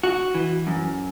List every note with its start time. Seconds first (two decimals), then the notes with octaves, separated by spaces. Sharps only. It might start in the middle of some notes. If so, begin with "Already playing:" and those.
0.03 F#4
0.35 E3
0.67 F#2